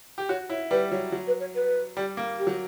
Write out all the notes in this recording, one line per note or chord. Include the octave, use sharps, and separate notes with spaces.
G4
F#4 C#5
E4 C#5
G3 B4
F#3 C#5
F#3
B4
C#5
B4
G3
A#3
G4
F#3